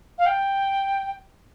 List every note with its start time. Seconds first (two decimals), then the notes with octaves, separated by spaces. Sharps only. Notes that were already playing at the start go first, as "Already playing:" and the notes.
0.18 F5
0.26 G5